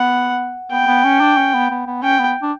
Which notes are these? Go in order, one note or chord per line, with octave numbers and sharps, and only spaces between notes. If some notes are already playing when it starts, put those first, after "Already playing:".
Already playing: B3 F#5
B3 G5
B3
C#4
D4
C#4
B3
B3
B3
C#4 G5
B3
D4